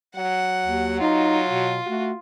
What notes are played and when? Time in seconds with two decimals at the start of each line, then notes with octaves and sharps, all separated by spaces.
0.16 F#3 F#5
0.62 D#2
1.01 D#4 F4
1.49 B2
1.86 A3 F#4